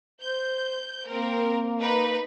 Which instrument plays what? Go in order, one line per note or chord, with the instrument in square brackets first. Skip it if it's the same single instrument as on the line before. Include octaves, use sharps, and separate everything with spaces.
[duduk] C5 [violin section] G6
[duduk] A#3 [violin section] C4 A#4
[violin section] D#4 B4